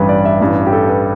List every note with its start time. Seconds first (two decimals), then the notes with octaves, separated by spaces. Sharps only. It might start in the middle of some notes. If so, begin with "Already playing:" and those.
Already playing: A1 G2 G3 B4
0.09 D5
0.25 E5
0.40 A1 G2 E3 D5
0.66 G4
0.73 A4
0.89 B4